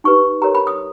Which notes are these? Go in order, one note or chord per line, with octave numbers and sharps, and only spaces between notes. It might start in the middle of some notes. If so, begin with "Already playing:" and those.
D#4 G4 B4 C#6
G4 A#4 C#5 A#5
B5
D#6